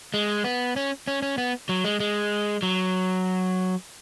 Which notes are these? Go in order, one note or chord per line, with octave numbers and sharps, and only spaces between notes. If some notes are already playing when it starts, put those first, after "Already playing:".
G#3
B3
C#4
C#4
C#4
B3
F#3
G#3
G#3
F#3